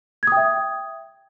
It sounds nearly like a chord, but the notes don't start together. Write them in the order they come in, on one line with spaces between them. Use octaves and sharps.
G#6 D#6 G5 E5